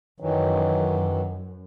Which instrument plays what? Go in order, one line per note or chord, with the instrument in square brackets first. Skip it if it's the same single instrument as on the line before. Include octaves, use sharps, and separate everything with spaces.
[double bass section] F#2 [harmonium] D#3 E3 F#3